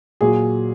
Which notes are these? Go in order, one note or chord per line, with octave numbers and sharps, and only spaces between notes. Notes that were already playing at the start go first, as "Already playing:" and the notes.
A#2 F#3 G#4